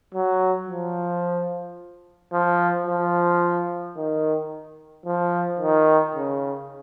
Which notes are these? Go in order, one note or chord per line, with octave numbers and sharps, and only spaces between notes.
F#3
F3
F3
F3
D#3
F3
D#3
C#3